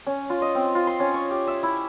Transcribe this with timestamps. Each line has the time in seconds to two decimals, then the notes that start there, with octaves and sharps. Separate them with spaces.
0.07 C#4
0.30 F4
0.42 D#5
0.55 C4
0.75 F4
0.87 C6
1.00 C#4
1.14 C#6
1.31 G4
1.48 E5
1.63 E4